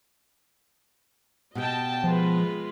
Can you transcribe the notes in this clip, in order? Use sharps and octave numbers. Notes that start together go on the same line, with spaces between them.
B2 G4 D#5 G5 A5
F3 G#3 F4 B4